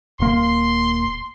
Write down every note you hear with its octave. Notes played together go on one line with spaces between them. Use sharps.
D#1 A#3 C6